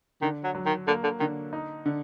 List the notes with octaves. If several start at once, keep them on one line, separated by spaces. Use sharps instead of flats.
D3 D#3
F#3
F#3
D#3
D3 A#3
D3
D3 D#3
D#4
D3